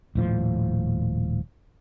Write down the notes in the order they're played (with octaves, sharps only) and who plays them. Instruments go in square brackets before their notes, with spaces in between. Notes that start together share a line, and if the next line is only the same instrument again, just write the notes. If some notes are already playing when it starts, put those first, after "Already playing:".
[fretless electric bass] D#1 A2 F3